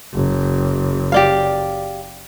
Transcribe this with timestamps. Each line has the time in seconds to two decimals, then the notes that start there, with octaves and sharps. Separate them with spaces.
0.14 F#1
1.12 G4 D5 F5